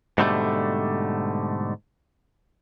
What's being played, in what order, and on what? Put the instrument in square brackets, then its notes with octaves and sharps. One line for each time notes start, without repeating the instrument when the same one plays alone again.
[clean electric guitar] G#2 B2 D3 G3 A3